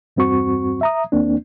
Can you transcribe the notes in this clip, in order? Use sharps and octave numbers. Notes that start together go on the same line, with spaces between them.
E2 G2 C4 F#4 C#6
E5 A#5 D#6
D#2 A#3 C4 D4